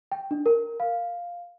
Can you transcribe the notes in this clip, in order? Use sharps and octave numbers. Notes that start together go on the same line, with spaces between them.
G5
D4
A#4
F5